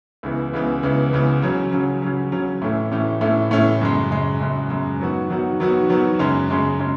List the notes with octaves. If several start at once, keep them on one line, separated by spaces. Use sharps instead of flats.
C#2 C#3 E3 B3
C#2 C#3 E3 B3
C#2 C#3 E3 B3
C#2 C#3 E3 B3
C#3 F#3 C#4
C#3 F#3 C#4
C#3 F#3 C#4
C#3 F#3 C#4
A2 E3 A3 C#4 E4
A2 E3 A3 C#4 E4
A2 E3 A3 C#4 E4
A2 E3 A3 C#4 E4
F#2 C#3 G#3
F#2 C#3 G#3
F#2 C#3 G#3
F#2 C#3 G#3
D#3 F#3 B3 F#4
D#3 F#3 B3 F#4
D#3 F#3 B3 F#4
D#3 F#3 B3 F#4
F#2 C#3 G#3 C#4
F#2 C#3 G#3 C#4
C#3 G#3 C#4